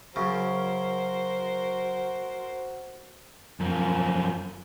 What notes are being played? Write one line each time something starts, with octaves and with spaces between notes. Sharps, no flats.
F#2 C#3 F#4 A#4 C5
F#2 F3